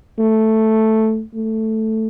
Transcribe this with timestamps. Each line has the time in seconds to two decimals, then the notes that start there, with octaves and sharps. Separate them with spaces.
0.18 A3
1.34 A3